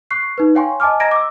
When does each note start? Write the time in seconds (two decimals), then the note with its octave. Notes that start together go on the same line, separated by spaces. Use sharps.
0.11 C#6 F#6 C7
0.38 D#4 B4
0.55 C#5 F5 G5 G#5 C6 C#6
0.80 D#5 G#5 A5 D6 F6
1.00 D#5 A#5 G#6 A#6 D7
1.11 D6 E6